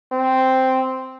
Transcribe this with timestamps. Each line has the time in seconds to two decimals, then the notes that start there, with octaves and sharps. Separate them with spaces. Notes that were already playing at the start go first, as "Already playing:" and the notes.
0.12 C4